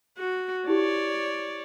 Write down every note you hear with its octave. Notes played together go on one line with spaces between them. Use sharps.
F#4
E4 G4 C#5 D5